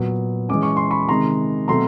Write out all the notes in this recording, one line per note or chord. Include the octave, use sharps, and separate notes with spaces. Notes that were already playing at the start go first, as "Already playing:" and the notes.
Already playing: A#2 F#3 B3
E3 G#3 C#4 D6
C#6
C6
B5 C#6
C3 D#3 G#3 A#5 C6
B2 F#3 A3 C4 A#5 C6